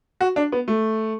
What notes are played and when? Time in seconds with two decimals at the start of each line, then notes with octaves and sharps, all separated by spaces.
0.21 F#4
0.36 D4
0.52 B3
0.68 A3